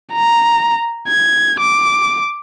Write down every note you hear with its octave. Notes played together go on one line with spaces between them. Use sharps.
A#5
G#6
D6